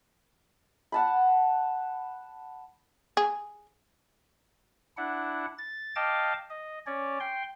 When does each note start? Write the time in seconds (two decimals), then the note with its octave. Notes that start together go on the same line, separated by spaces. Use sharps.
0.92 F#5 A5 B5
3.17 G#4
4.97 D4 E4 F#5
5.58 A6
5.96 D#5 F5 G5 A5 D6
6.50 D#5
6.86 C#4 C#5 D5
7.20 G5 C6